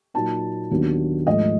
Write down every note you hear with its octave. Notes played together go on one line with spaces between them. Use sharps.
A#2 F#3 A#3 D#4 A5
D#2 D#3 F#3 B3 D4
G#2 F3 A3 D#5